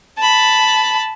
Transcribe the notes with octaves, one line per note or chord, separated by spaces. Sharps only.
A5 B5